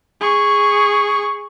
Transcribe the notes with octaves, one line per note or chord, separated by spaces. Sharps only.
G#4 C#6